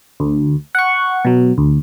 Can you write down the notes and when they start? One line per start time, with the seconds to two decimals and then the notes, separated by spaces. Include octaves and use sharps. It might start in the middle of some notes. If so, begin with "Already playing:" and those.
0.20 D2
0.75 F#5 C#6
1.25 B2 F#3
1.58 D2